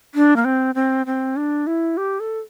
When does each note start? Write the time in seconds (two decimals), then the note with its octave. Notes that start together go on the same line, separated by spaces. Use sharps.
0.15 D4
0.36 A#3
0.45 C4
0.75 C4
1.06 C4
1.36 D4
1.67 E4
1.97 G4
2.20 A4